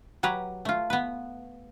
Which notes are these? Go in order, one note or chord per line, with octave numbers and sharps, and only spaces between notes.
F#3 G4 B4 A#5
A3 F4
B3 B4